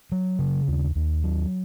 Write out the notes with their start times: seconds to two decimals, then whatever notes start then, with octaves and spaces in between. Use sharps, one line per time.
0.12 F#3
0.39 C#3
0.68 D#2
0.96 D#2
1.24 F#3